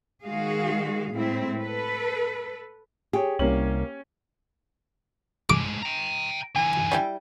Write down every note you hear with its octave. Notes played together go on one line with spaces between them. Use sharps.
D#3 G#3 F#4 G#4 F5
A2 G#3 C4 E4
A4 B4
G4 G#4 C#5
C2 A#3 C#4 F#7
A2 G#3 D6
G5 A#5
D3 E3 G#5
G3 E4 G5